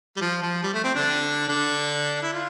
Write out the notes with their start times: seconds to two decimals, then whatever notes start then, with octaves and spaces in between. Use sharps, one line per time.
0.16 G3
0.21 F3
0.42 F3
0.63 G3
0.74 A3
0.84 C4
0.95 D3 D4
1.48 D3 D4
2.22 E4
2.33 F4